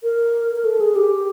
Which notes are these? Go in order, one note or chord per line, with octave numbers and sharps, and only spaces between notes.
A#4
A#4
A4
G#4
G4